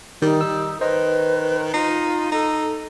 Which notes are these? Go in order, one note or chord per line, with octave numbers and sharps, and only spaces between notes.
D#3 G3 D#4
E6
D#3 B4 C5 D#5
D#4 F4 C7
D#4 A4